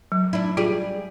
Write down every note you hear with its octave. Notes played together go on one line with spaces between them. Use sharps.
F#3
D4 E4
G3 F4 G#4